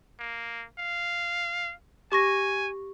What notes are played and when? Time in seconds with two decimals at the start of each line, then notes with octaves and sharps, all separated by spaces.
0.19 A#3
0.79 F5
2.12 G4 G#5 C#6 A#6